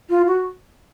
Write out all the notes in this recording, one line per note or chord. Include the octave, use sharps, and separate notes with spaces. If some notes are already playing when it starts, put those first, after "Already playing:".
F4
F#4